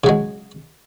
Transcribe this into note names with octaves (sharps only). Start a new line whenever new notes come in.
C#3 F#3 G#3